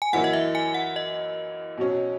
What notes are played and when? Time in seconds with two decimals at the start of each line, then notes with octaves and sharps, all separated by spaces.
0.02 G#5
0.13 F#2 E3 A#3 E4 F#5
0.24 D#5
0.33 E5
0.55 G#5
0.74 F#5
0.96 D#5
1.78 B2 F#3 C#4